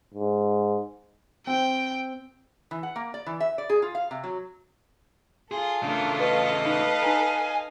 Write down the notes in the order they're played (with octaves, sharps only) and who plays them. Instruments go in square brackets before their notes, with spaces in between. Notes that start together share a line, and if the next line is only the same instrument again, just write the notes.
[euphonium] G#2
[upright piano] C4 [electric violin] G5
[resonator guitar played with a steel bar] E3
F#5
A#3
D5
E3
E5
D5
G#4
F4
F5
C3
F#3
[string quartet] F4 A4 [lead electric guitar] G#4 [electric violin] C6
[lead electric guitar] C#3 A3 [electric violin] D4 A#4
[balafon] B4 [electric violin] D#5 F5
[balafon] D#4 [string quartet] A4 B4
[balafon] D#4 A#5 [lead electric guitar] G#5